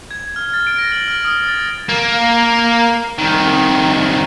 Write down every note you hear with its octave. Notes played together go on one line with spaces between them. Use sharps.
G#6
F6
A6
D7
A#6
F#7
F6
D#6
A6
A#3
C2 D#3